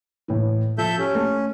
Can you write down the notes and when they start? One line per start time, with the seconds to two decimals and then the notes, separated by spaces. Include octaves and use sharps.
0.28 A2 E3
0.78 F3 A4 E5 G6
0.98 C#4 G4
1.15 A3